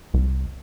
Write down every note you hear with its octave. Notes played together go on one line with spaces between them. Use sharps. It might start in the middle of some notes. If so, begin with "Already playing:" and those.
C2